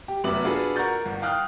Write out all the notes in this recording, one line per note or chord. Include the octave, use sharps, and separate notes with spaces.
G4
F1 F#2 B3 E5 D6 F#7
D4 F4 F#4 G#4 A4 B4
A#4 F#5 A#5 C#6 G6 A6
G1
F5 G5 D#6 F6 F#6